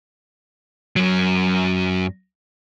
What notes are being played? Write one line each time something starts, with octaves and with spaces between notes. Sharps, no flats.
F#2 F#3